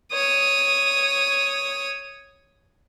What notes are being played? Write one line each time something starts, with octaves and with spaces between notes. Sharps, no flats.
C#5 D#6